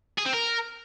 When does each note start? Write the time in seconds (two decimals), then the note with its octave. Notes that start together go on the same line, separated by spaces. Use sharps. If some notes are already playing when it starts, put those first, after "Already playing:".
0.18 G#4
0.25 C4
0.33 A#4